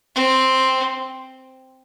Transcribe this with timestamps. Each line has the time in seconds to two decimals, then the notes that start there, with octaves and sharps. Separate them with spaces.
0.16 C4